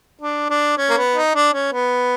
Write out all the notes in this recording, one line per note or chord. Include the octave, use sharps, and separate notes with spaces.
D4
D4
C#4
A#3
B3
D#4
D4
C#4
B3